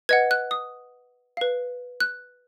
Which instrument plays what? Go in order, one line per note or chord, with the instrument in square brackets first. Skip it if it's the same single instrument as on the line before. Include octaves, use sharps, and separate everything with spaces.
[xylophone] B4 D#5 F#5 G#6
F#6
D#6
B4 F5
F#6